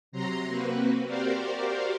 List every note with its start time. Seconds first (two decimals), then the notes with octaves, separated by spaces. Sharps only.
0.12 C3 F#3 A#5 C6 A#6
0.47 A#3 C4 F#4 B4
1.06 F#4 G4 A#4 C5 D5 F5